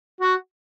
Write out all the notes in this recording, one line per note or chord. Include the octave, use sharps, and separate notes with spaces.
F#4